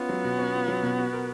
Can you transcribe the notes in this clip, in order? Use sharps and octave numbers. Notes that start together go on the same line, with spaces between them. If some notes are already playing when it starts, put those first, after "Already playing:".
Already playing: B3 C#4 F4
F#3
B2
C#4
F4
F#3
B2
F#4
A#4